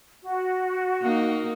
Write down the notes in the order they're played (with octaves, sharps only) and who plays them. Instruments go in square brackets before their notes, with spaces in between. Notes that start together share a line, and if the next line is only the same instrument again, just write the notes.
[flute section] F#4
[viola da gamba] A#3 D#4